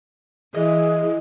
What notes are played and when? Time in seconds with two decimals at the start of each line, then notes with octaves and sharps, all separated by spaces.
0.54 E3 G#4 D#5